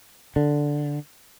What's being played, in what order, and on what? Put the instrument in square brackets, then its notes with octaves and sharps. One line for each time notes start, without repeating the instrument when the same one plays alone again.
[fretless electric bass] D3